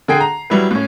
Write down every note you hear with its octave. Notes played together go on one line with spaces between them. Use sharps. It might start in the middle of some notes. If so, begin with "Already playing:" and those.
D3 G#4 G5 C7
A#5
F#3 G3 E4 B4
A2 C#4